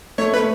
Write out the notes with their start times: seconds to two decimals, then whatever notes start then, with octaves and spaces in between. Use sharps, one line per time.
0.18 A3 C#5
0.33 A3 B4